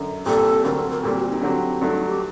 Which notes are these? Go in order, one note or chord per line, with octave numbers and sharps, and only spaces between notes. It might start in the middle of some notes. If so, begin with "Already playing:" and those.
Already playing: F#2 D3
C2 A#2 G3 C4 G4 A4
D2 D3 F#3 C4 A#4
A4
A#4
A#2 G3 C4 A4
F#4
D#4
D3 F#3 C4 D4 G4
G2 F#3 A3 D#4
D#4
G4